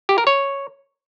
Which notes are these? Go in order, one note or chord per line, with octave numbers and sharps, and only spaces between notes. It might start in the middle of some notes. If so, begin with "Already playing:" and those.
G4
A#4
C#5